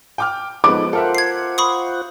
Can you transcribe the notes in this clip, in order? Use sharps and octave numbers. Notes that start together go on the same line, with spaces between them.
G5 D6 F6
F3 G#3 B3 D#4 A4 B4 D6
F4 A4 A#4 C5 E5 F#5
G#6 C7
B5 C#6 D#6